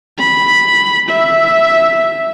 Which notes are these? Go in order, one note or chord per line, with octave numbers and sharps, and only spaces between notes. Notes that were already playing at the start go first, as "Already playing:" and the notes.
B5
E5